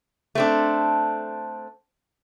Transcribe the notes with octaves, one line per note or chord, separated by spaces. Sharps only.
A3 C4 D4